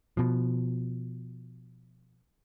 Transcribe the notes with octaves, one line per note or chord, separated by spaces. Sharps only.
B2 F3